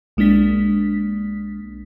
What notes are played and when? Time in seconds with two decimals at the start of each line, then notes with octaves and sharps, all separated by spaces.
0.17 B1 G#3 A#3 D4 B6